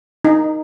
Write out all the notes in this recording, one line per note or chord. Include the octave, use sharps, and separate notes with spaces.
D#4